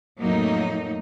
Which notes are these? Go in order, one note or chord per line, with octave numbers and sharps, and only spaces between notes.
F2 A2 F#3 A3 A#3 D#4